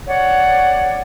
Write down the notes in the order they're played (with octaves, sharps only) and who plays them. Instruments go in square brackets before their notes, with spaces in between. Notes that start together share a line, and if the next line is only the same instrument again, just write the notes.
[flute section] C#5 D5 F#5